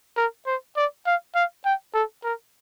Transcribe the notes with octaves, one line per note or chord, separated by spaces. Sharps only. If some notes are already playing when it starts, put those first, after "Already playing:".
A#4
C5
D5
F5
F5
G5
A4
A#4